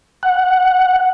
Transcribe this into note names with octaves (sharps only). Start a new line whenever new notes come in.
F#5